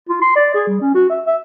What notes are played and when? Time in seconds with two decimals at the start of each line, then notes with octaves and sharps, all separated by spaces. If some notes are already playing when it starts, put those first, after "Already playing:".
0.09 F4
0.22 C6
0.36 D5
0.54 G#4
0.68 G3
0.81 C#4
0.95 F#4
1.10 E5
1.26 E5